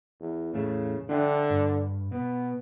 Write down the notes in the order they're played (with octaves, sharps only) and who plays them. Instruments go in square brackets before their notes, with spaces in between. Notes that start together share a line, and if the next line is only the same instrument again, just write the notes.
[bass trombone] E2
[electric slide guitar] E2 A2 A3 [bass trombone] C#3
[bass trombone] D3 [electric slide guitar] D4 E5 G5
[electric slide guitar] G2
[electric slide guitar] B2 [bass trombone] B3